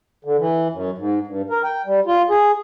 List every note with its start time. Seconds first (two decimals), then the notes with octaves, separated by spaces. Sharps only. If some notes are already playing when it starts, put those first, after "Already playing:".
0.25 D3
0.39 E3
0.72 F#2
0.98 G#2
1.27 G2
1.50 A#4
1.64 G5
1.86 G3
2.07 F4
2.30 G#4